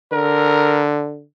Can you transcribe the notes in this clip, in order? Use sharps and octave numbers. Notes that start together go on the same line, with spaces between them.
D3 A#4